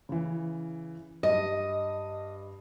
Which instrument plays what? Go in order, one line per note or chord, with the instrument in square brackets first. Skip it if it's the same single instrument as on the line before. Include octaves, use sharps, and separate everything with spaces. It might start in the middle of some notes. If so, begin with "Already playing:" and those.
[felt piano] C#3 E3
[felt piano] G2 [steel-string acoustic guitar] D#5